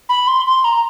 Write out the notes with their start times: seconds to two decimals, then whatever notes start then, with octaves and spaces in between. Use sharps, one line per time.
0.09 B5
0.27 C6
0.46 C6
0.64 A#5